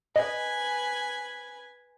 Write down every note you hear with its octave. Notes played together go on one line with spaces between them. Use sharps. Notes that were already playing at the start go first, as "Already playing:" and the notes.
B4 D#5 G#5